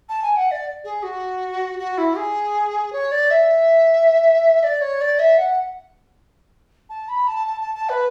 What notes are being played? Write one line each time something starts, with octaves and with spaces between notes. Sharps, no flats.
A5
G#5
F#5
D5
G#4
F#4
F#4
E4
G#4
C#5
D5
E5
D5
C#5
D5
E5
F#5
A5
B5
A5
A5
A5
A5
B4